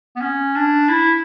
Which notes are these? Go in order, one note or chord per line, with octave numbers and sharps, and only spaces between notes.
B3
C#4
D4
E4